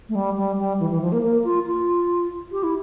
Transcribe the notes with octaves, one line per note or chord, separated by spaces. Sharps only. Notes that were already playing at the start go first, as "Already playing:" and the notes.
A3
G3
G3
G3
E3
E3
F3
A#3
A#3
F4
F4
G4
E4